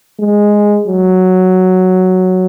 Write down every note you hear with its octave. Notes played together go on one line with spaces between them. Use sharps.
G#3
F#3